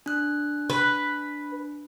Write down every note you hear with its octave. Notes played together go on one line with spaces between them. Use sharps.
D4 F#6
B4